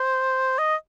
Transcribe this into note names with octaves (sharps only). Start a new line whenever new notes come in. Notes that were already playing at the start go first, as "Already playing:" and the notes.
Already playing: C5
D#5